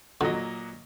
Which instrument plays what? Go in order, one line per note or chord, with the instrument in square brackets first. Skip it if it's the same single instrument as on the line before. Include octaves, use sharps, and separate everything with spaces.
[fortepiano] A#2 F#3 D#5 [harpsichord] D3